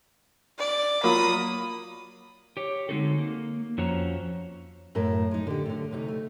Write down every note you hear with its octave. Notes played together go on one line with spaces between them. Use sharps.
D5
F#3 A#3 F4 B5 D#6
G4 C#5
D3 G#3 C4 D#4 F#4 A4
A#3
F2 C#4 F#4 C5 C#5 A#5
F#2 A2 A#4 A5
G#3 D#4
D3 G4
A2 D3
D2 C3 D#4
A3